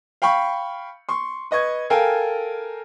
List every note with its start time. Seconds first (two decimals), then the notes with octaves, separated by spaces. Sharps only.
0.22 F5 G5 B5 C#6
1.09 C6 C#6
1.51 B4 D#5 C#6 G#6
1.90 A4 A#4 F5 G5 G#5